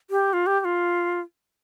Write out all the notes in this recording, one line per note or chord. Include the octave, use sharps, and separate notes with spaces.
G4
F4
G4
G4
F4